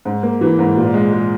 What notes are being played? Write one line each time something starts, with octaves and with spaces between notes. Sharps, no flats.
G#2
A#3
E3
G#2
A#2
G#3
G#3